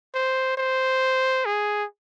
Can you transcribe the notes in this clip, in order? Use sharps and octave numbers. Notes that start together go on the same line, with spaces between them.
C5
C5
G#4